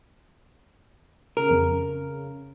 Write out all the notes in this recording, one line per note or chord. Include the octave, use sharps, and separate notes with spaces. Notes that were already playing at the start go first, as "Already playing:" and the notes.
C#3 A#4
F2